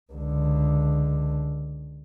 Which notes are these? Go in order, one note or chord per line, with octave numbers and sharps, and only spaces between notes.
C#2 D3